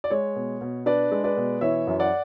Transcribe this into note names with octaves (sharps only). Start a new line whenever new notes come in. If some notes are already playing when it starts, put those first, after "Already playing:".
D5
G#3 C#5
B2
B2
D4 B4 D5
G#3
B4 D5
B2
E3 C#5 E5
F#2
D5 F#5